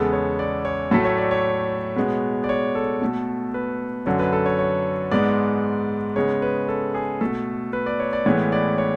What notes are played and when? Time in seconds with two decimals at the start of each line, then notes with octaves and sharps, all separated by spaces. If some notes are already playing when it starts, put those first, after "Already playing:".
Already playing: E2 C#3 G#3 B3 A4
0.13 C#5
0.39 D5
0.65 C#5
0.91 A2 F#3 A3 A4
1.05 C#5
1.18 D5
1.31 C#5
1.96 B2 G#3 B3
2.44 D5
2.49 C#5
2.75 A4
3.01 B2 A3
3.54 B4
4.06 F#2 D3 F#3 C#5
4.19 B4
4.33 A4
4.46 C#5
4.59 C#5
5.11 G#2 G#3 B3 D5
6.16 C#3 G#3 B3 C#5
6.42 B4
6.68 A4
6.95 G#4
7.21 B2 A3 A4
7.73 B4
7.86 D5
8.00 C#5
8.13 D5
8.26 A2 E3 G#3 B3 C#5
8.52 D5
8.78 C#5